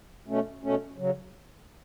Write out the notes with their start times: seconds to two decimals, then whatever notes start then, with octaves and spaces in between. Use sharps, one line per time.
0.27 B2 A3 C#4
0.63 B2 A3 C#4
0.98 C#3 F#3